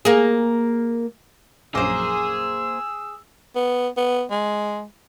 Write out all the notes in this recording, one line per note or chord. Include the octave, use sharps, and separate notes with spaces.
A#3 G#4
A#1 F#2 A#3 G#4 C5 E6
B3
B3
G#3